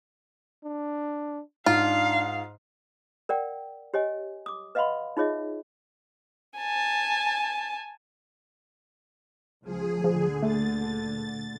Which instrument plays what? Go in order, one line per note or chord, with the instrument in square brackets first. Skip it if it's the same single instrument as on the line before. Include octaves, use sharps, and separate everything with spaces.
[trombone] D4
[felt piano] G#2 [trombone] D4 [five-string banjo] F4 [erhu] F5
[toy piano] A#4 D5 F#5 G5
G4 C#5 D#5 G#5
D6 D#6
B4 D#5 F5 F#5 B5 C6
D#4 F4 G#4 C#5 D#5 E5
[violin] G#5 A5
[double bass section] C#2 F3 [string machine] G#4
[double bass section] D2 A#2 D3 [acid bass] F3
[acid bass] A3 [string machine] A6